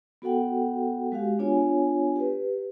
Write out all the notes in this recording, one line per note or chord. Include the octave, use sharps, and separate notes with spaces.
B3 F#4 A4 F#5 G5
G#3 F#4 G4 F5
B3 D4 F4 C#5 G#5
G4 B4